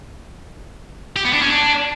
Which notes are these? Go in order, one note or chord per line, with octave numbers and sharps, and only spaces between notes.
G4
B3
D4
C#4
D4